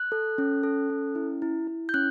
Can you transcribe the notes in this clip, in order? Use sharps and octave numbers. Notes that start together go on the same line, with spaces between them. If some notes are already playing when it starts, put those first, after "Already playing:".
Already playing: F#6
A4
C#4
A4
C#4
E4
E4
E4
G6
C#4 F#6